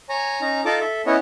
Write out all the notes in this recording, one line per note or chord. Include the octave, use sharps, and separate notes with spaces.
C#5 G#5 A#5
C#4 D#4 A#5
D#4 F4 A4 A5 D6
A4 E5
B3 C#4 E4 C#5 D#5 F#5